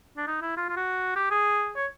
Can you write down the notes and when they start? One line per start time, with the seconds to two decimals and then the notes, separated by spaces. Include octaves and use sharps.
0.17 D4
0.27 D#4
0.42 E4
0.57 F4
0.69 F4
0.76 F#4
1.16 G4
1.31 G#4
1.76 C#5